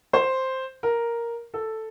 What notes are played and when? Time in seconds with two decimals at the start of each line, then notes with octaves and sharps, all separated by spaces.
0.13 C5
0.83 A#4
1.54 A4